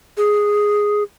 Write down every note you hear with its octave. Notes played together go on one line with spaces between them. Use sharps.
G#4